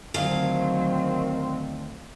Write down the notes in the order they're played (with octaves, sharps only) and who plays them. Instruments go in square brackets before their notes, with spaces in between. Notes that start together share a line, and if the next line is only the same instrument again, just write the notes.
[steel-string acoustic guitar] D2 F5 [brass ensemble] D#3 C4 [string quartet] F#3